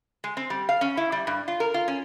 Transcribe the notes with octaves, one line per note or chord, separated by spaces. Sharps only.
G#3
C4
G3
F5
C#4
E4
G3
G2
F4
A#4
F4
C#4